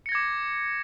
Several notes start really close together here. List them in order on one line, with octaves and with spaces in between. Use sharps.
C#7 A#6 G#6 D6